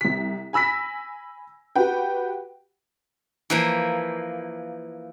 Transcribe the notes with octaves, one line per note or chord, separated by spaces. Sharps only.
C2 B6
G#5 B5 E6 A#6 B6
F#4 G4 B4 F#5 G5
E3 F3 A#3